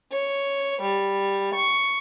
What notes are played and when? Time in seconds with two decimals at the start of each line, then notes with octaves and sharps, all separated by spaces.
0.12 C#5
0.82 G3
1.55 C#6